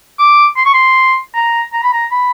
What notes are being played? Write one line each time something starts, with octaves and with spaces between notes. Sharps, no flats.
D6
C6
C#6
C6
A#5
A#5
B5
A#5
B5